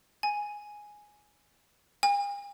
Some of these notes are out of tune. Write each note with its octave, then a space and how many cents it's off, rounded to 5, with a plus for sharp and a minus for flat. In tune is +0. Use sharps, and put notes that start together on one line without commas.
G#5 +0
G#5 -45